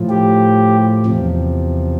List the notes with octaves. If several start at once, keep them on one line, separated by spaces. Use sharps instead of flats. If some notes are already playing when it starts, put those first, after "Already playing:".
Already playing: A2 F3
G4
E2 C3 F3